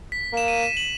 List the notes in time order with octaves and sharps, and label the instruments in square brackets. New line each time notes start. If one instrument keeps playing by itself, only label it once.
[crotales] B6
[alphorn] A#3 [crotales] E7
[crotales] D#7
E7
F#7